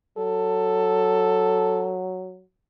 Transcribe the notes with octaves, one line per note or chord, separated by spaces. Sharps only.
F#3 A4